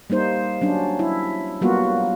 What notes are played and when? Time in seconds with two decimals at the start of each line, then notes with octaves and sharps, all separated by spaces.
0.10 G3 A#3 D#4 C5
0.61 F#3 C#4 D4
0.99 E4
1.61 F#3 G3 A#3 B3 F4 F#4